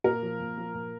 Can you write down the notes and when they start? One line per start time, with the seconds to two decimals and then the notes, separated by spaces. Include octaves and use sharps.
0.04 A#2 A#4
0.23 F3
0.40 A#2
0.57 F3
0.75 A#2